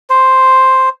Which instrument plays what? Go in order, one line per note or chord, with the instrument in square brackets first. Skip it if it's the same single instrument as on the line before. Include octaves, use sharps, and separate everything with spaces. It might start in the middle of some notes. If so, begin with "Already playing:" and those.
[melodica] C5